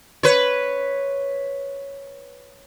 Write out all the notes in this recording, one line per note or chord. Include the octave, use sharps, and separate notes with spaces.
B4 C#5